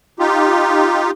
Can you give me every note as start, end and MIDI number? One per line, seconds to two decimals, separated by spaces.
0.19 1.11 63
0.19 1.11 65
0.19 1.11 67